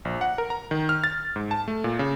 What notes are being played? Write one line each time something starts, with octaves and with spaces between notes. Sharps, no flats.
A#1
F#5
A#4
A#5
D#3
F6
A6
G#2
A5
A3
A#2
C#3